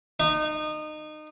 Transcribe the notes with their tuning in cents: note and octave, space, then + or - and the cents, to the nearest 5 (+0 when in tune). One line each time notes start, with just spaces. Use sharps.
D#4 -25